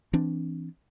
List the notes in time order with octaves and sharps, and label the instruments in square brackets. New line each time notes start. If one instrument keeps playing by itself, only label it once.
[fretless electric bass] E3 C4 D4